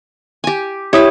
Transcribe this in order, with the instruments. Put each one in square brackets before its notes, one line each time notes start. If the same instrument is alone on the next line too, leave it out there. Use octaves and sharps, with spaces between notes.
[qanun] G4 G#5
[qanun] E4 E5 [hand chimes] G4 C#5 D#6